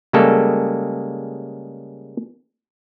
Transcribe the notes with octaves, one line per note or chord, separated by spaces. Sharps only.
C#3 G3 G#3 A#3 A4